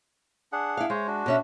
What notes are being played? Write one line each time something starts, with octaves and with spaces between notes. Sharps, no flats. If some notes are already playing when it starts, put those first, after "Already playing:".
D4 G#4 F#5
E4 F5
G#3 C5 C#5
D4 F#4
B2 C#4 E5